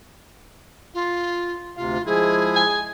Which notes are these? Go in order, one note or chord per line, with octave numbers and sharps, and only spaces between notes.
F4
D2 C3 F4 F5
F3 G#3 E4 G#4
G#5